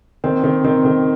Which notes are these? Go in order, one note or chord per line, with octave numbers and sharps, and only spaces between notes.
D#3 C4
D#3
D#3 C4
D#3